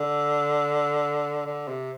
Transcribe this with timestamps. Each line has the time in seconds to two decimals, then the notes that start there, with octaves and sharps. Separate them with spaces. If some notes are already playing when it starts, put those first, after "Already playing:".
Already playing: D3
1.46 D3
1.68 C3